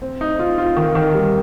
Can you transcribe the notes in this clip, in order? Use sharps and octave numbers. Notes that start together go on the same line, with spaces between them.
C4
D#4
F4
F4
D#3
D#3
G3